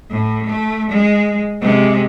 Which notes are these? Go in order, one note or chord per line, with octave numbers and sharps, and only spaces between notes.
A2
A3
G#3
C3 G#3